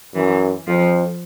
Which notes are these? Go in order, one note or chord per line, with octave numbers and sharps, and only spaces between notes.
F#2 E3
F2 F3